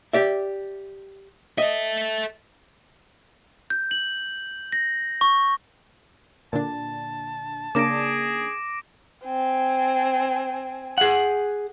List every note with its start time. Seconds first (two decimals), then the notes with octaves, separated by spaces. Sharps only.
0.13 G4 D5 E5
1.58 A4 D#5 E5
3.70 G6
3.91 F#7
4.72 A#6
5.21 C#6
6.53 A#2 D3 D4 A5
7.75 C#3 A#3 D4 G#4 D6 A#6 D7
9.25 C4 G#5
10.98 G#4 F#5